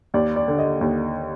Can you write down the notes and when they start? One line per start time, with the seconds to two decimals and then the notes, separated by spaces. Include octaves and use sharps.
0.14 D#2 D5
0.36 D5
0.48 D3
0.59 D#5
0.81 D#2